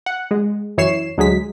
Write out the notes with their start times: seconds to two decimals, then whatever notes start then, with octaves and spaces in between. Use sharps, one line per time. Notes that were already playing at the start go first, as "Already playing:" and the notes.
0.06 F#5
0.31 G#3
0.78 F#2 E3 C#5 C7 E7
1.18 D2 F#3 G#3 B6